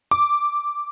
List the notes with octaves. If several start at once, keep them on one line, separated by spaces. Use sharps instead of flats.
D6